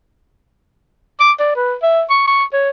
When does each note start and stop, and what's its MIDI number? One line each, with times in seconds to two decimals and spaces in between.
1.20 1.32 86
1.39 1.56 74
1.56 1.75 71
1.83 2.03 76
2.10 2.24 85
2.27 2.44 85
2.53 2.70 73